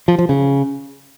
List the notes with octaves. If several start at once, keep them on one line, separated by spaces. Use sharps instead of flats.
F3
F3
C#3